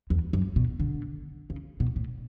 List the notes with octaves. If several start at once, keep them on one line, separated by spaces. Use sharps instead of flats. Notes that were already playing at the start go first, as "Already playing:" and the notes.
E2
F#2
B2
D3
C#3
B2
A2